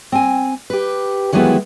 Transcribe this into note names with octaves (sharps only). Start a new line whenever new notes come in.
C4 G#5
G4 B4
D#3 E3 F#3 G#3 B3 E4